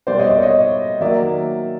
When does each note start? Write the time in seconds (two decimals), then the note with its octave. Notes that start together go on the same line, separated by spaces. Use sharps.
0.07 B2 G3 B3 C5 D5
0.19 C#5 D#5
0.30 D5 E5
0.42 C#5 D#5
1.01 D#3 F#3 A#3 D5 E5